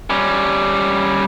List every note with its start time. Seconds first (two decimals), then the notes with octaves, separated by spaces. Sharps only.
0.10 G3 C#4